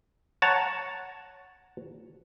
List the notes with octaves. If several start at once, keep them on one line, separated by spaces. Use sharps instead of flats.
C#5 F#5 A5 A#5